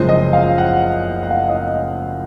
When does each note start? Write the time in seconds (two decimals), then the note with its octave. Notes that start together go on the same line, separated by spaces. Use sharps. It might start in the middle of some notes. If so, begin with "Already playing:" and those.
Already playing: F#1 F#2 F3 G#3 C5
0.09 D#5
0.33 F5
0.58 F#5
1.23 F#5
1.31 F5
1.49 D#5
1.67 D#5